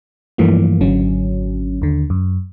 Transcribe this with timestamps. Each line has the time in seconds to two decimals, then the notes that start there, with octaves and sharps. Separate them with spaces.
0.38 G2 E3 F3 A3 A#3
0.81 G#1 D3 F#3 C#4
1.82 D#2 D3
2.10 F#2